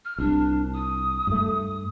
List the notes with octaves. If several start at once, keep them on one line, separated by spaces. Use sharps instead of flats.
F6
C2 D4
D#6
G2 A3